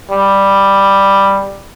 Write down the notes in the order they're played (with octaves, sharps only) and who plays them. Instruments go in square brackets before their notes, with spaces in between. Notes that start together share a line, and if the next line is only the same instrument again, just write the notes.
[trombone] G3